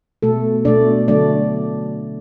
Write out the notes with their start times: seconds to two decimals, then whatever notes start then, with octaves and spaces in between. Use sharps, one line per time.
0.22 B2 A3 A4
0.65 B2 A3 D4 D5
1.08 D3 F#3 A3 D4 D5